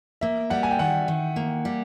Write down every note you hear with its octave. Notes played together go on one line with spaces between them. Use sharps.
A#3 E5
G3 F#5
G#5
G5
D#3 F#5
D#3
A#3
G3